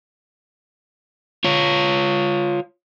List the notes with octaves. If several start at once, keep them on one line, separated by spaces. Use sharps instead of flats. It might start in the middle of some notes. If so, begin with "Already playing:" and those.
F4 C#5